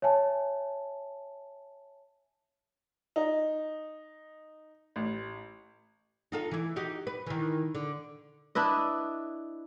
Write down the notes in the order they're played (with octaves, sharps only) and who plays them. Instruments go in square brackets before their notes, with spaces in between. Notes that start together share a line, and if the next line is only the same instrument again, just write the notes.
[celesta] C#5 E5 G#5 A5
[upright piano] D#4
A1
[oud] D#4 F4 A4
E3 E4
D#4 F#4 G4
B4
D#3 E3
D3
[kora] D4 E4 B4 D#5